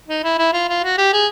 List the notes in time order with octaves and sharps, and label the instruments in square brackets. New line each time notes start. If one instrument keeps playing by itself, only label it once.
[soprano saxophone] D#4
E4
E4
F4
F4
F#4
G4
G#4